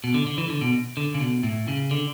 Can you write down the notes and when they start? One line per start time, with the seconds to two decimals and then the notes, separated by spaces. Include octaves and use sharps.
0.04 B2
0.14 D3
0.27 D3
0.38 E3
0.50 D3
0.61 B2
0.97 D3
1.14 C#3
1.21 B2
1.43 A2
1.68 C#3
1.91 D3